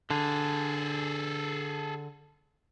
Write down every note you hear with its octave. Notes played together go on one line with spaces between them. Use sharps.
D3 G#4 A4